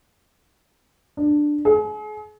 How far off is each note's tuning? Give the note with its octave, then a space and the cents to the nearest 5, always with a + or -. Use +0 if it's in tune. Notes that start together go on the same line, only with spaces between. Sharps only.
D4 +10
G#4 +40